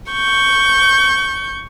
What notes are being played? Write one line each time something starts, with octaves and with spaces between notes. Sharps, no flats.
C#6 G6